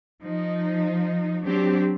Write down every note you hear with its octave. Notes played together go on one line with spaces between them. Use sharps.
F3 D#4
F#3 C4 D4 G4